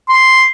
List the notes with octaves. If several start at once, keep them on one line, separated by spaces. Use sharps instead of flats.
C6